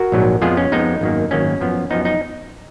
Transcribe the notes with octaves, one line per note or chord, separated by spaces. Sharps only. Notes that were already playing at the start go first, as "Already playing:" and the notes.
Already playing: F#4 A#4
A#1 G#2 F#3
F2 F3 G#3 B3 F4 G#4
C#4
F2 F3 G#3 B3 D#4
G#1 F#2 D#3 A#3
G#1 F#2 D#3 A#3 C#4
F#2 F3 B3
F#2 F3 B3 D#4
D#4